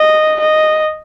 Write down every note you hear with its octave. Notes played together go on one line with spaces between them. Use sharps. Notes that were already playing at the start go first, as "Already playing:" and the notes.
Already playing: D#5
D#5